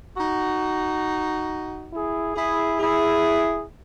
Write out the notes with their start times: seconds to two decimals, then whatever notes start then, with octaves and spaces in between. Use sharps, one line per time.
0.17 D#4 F#4
1.92 E4 G#4
2.35 E4 G#4
2.80 E4 G#4